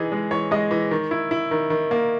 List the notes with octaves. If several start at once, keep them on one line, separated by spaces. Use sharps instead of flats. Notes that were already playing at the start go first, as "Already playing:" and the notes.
Already playing: E3 D#4 G#4
G#3
E3 C#5
G#3 D#5
E3
D#3
E4
E4
D#3
D#3
A#3